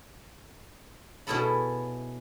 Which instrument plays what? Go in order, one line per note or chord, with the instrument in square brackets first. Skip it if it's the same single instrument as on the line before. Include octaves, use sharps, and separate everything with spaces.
[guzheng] B2 C#4 E4 G#4 A4 B5